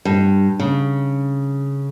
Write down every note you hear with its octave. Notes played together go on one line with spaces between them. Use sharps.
G2
C#3